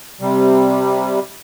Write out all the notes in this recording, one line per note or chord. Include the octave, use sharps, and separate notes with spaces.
C3 G3